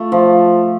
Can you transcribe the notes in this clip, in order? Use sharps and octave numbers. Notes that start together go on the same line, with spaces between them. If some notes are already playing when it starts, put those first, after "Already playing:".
Already playing: A3 F4
F3